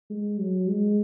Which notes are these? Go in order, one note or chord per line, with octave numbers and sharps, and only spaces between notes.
G#3
F#3
G#3